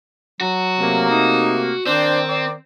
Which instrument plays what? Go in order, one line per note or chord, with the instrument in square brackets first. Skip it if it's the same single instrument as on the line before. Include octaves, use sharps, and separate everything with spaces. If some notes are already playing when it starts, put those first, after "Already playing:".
[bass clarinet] F#3 [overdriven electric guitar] F#4
[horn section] C3 A3 A#3
[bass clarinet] D#4
[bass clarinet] D#3 [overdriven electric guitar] C4 [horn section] D4 C5 D5
[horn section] D5